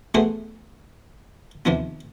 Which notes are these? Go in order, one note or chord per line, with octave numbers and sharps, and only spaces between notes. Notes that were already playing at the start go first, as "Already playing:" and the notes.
A3 B3 F#4 G#4 C5
D#2 C3 F3 B3